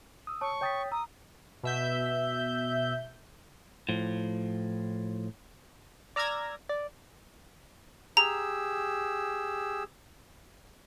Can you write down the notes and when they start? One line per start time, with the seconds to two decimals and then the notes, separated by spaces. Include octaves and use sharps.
0.27 D#6 E6
0.41 C#5 A5 C#6
0.61 C#5 G5 D#6 G6 A6 B6
0.91 A#5 D#6 E6
1.63 B2 E5 G6
3.89 A2 F3
6.16 D5 A#5 E6 F6 G#6 A#6
6.69 D5
8.17 G4 G#4 A#5 E6